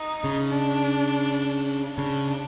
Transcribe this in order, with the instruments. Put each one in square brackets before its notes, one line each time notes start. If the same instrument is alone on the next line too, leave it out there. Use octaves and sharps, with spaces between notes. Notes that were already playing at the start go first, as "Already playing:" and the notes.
Already playing: [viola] D#4
[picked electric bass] C#3
[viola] D4
[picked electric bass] C#3 [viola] D4